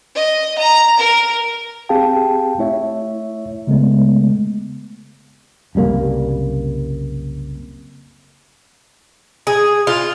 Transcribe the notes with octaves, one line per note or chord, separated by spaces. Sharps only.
D#5
A#5
A#4
C4 G4 G#4 F5 G5 A5
A3 E4 C#5 E5
C#3 G#3 A3 B3
F#1 C2 G3 A#3
G#4
F4